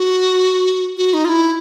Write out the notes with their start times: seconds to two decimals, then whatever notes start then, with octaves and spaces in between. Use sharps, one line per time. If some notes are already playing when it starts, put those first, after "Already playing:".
Already playing: F#4
0.97 F#4
1.14 D#4
1.25 F4
1.29 E4